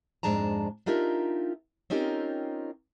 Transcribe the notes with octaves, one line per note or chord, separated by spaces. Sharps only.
F2 G#2 G#3 D4 A5 A#5
D4 D#4 F4 G4 A#4 E5
C4 C#4 D#4 F4 G4 A#4